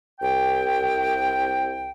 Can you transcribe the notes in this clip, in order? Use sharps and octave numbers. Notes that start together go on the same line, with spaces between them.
C2 G5